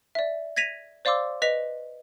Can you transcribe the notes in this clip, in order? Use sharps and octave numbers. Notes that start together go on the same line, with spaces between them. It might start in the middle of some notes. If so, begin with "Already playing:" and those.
D5 E5
G#6 A#6 B6 D#7 F7
C5 D5 F5 C6 D6 E6
B4 D#5 B6 F7